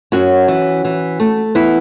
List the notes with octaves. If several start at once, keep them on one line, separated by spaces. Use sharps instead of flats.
F#2 C#4 F#4
E3
E3
A3
E3 B3 E4